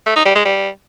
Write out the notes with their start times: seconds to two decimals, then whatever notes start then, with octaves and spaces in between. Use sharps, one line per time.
0.06 A3
0.16 D#4
0.26 G3
0.35 G#3
0.45 G3